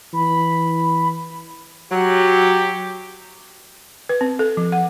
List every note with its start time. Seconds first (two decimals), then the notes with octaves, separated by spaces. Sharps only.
0.13 E3 B5
1.91 F#3 G4
4.09 B4
4.21 C4
4.39 A4
4.57 F3
4.72 F#5